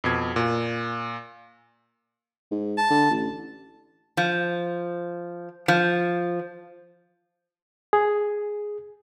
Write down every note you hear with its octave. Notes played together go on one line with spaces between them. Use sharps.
F2 B2 G#6
A#2
G#2
A5
D3
A1
F3
F3
G#4